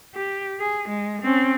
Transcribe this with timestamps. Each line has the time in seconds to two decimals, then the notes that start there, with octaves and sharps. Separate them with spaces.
0.15 G4
0.60 G#4
0.89 G#3
1.22 C4 C#4